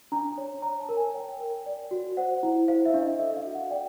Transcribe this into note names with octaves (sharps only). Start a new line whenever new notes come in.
D4 A#5
C#5
C#5 A#5
A5
A#4
G#5
C#5 G5
A#4
D5
F#4
C5 F#5
E4
C5 F5
E5
D4
D#5
A4 E5
F5
F#4
F#5
D5 G5